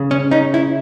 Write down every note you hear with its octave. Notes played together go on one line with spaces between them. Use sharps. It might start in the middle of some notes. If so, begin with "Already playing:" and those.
Already playing: C#3
C#4
C#4 D#4
E4